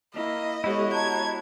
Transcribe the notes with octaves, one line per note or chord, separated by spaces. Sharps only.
A#3 E4 D#5
G#3 B3 E4 F#4 G4 A4 C#5
D#5 A5 A#5 G#6